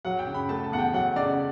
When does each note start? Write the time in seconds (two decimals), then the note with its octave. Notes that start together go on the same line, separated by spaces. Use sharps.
0.05 F#3 F#5
0.19 G5
0.27 C#3
0.34 B5
0.49 A3 A5
0.64 A5
0.72 E2 F#5
0.79 G5
0.93 F#3 F#5
1.16 C#3 D5